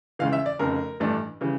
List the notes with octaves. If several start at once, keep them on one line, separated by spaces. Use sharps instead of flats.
C#2 C#3 E3 F5
E5
D5
F1 F2 C#3 A#4
A1 G2 E3 A3 D4
C#3 E3 G3